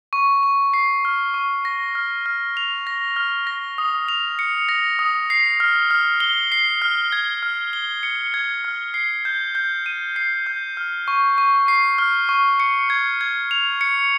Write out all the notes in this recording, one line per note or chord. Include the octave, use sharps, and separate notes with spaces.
C#6
C#6
C7
F6
C#6
A#6
F6
F6
F7
A#6
F6
A#6
D#6
F7
C#7
A#6
D#6
C7
F6
F6
G7
C7
F6
G#6
F6
G7
C#7
G#6
F6
C7
G6
G6
D#7
C7
G6
F6
C#6
C#6
C7
F6
C#6
C#7
G#6
G#6
F7
C#7